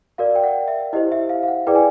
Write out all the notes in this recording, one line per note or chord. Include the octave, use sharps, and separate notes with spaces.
F#4 A#4 D5 F5
G5
F#5
E5
E4 G4 C5 D#5
E5
F5
F5
F#5
E4 G#4 B4 D5 G5
G#5